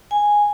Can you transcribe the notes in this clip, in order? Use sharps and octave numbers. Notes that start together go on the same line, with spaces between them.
G#5